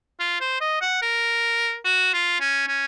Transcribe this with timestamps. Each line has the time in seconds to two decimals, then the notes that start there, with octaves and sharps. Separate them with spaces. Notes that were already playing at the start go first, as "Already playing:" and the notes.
0.20 F4
0.41 C5
0.61 D#5
0.82 F#5
1.02 A#4
1.85 F#4
2.13 F4
2.41 C#4
2.68 C#4